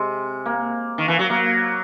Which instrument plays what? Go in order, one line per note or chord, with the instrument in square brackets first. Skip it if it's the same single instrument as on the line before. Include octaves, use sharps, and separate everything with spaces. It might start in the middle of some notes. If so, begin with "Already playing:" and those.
Already playing: [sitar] C3 [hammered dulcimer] G#3
[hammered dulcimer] A#3
[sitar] D#3
E3
F#3
[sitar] F#3 [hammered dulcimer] A#3